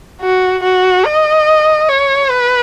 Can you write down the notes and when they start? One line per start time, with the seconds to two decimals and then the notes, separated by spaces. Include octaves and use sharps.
0.22 F#4
0.63 F#4
1.05 D#5
1.89 C#5
2.31 B4